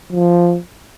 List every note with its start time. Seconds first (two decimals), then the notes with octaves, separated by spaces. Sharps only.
0.12 F3